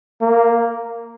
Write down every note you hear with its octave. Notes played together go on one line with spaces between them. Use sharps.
A#3